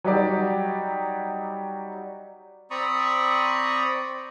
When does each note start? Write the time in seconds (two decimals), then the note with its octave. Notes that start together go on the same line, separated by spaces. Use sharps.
0.04 F#3 G3 D#4 F#4 G4 D5
2.71 C4 D5 A#5 B5 C#6 D#6